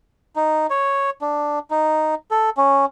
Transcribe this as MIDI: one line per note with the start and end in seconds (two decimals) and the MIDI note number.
0.36 0.67 63
0.70 1.10 73
1.21 1.59 62
1.71 2.15 63
2.31 2.50 69
2.57 2.85 61